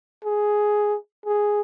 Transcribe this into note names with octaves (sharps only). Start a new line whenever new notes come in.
G#4
G#4